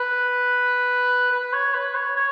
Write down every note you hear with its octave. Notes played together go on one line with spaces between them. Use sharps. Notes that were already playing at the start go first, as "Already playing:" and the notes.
Already playing: B4
B4
C#5
B4
C#5
C#5